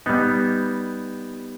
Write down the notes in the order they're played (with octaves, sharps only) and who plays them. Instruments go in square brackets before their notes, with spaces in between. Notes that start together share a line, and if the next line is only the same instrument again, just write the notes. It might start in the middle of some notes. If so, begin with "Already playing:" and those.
[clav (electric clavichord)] G3 B3 D#4